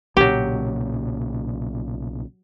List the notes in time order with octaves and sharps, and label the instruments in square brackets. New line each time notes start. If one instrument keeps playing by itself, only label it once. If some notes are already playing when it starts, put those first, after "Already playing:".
[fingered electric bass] B1 A#2 C#3 [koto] F#3 G4